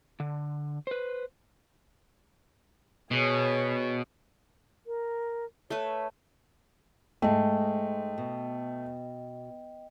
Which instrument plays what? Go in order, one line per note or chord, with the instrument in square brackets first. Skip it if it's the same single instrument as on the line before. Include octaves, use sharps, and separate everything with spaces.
[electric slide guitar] D3
B4 C5
[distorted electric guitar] B2 [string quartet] G#4 C#5
[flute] A#4
[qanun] A3 B4 [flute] C#5
[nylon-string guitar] G#2 G#3 [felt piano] A3 [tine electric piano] D#5 G5
[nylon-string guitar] B2